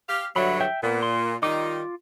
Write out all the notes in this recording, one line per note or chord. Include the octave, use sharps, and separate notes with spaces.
G4 F5
G2 D3 F#3 E5 B5
E5 G5
A#2 B3
C6
D#3 G3 D#4 F4 D6